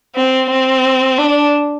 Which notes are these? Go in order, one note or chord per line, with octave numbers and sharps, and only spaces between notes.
C4
C4
D4